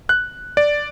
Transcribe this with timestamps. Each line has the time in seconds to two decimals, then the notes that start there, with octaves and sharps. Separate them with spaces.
0.09 F#6
0.57 D5